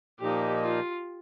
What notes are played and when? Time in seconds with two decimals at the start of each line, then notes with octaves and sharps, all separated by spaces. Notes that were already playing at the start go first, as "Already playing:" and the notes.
0.20 A#2 F3 A#3 D#4 G4
0.63 F4